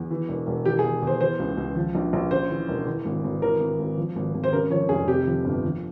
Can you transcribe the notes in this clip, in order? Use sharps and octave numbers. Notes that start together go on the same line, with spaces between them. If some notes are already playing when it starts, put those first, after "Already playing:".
Already playing: E2
E3
E1
E1
E3 G4
G#4
E2
E2 C5
E3 C5
C#2
C#2
F3
A#1
A#1
C#3 C5
E3
E1
E3
G#1
G#1
E3 A#4
G#1
G#1
F3
G#1
G#1
C5
C#3 A#4
F3 C#5
F1 G#4
C3 G4
F3
G1
F3